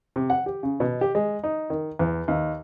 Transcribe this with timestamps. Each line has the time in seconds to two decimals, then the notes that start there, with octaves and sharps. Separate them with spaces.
0.16 C3
0.30 F#5
0.46 G4
0.63 C#3
0.80 B2
1.01 G4
1.15 G#3
1.43 D#4
1.70 D#3
1.99 E2
2.28 D#2